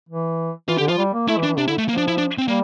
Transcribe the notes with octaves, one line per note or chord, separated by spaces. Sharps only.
E3
E3 F4
D3 G4
F3 F4
G3
A#3
A3 E4
E3
D4
E3
C3 D4
D3 E4
A3
F3 A#3
D4
E4
D4
C4
G3 A#3